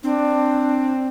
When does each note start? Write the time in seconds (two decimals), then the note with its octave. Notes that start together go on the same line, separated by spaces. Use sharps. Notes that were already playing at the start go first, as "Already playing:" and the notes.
0.03 C4 D4